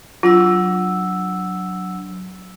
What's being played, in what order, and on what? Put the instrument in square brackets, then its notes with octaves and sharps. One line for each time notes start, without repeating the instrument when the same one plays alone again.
[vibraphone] F#3 D4 E6 [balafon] F4